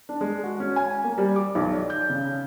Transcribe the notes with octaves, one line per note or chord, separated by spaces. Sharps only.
D4
G#3
F#4
C#4
G#5
A#3
G3
D6
B1
D5
G6
C#3